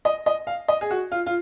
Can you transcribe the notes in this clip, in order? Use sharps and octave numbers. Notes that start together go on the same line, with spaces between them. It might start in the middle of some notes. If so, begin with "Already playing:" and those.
D#5
D#5
F5
D#5
G#4
F#4
F4
F4